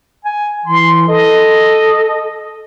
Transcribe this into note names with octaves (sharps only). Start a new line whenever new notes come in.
G#5
E3 C6
A4 D#5